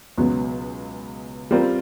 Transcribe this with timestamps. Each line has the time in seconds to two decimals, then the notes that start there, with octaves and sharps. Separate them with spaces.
0.18 C#2 B2 F#3 B3
1.51 G3 C4 F4 A#4